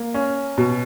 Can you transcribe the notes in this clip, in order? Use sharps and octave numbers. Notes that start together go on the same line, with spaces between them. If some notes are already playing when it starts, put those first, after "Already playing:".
Already playing: A#3
C#4
B2